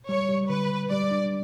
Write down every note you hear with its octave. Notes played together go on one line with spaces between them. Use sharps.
G3 C#5
G3
D3 B4
G3
G3 D5
D4